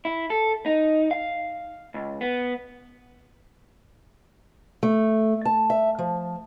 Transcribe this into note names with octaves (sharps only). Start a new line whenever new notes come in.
E4
A4
D#4
F5
C#2
B3
A3
A5
E5
F3